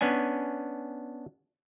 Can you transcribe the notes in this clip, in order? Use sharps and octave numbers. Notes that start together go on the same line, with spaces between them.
B3 C#4 D4 G#5